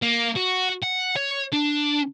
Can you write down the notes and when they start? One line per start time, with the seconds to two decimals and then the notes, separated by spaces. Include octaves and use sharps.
0.02 A#3
0.36 F#4
0.83 F#5
1.16 C#5
1.53 D4